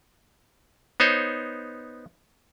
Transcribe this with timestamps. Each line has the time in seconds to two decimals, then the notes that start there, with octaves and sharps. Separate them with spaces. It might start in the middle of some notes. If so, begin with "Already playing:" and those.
1.00 B3 D#4 C5 C#5